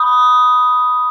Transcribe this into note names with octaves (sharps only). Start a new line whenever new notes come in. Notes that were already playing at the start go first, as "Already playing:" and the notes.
Already playing: B5 D#6 G6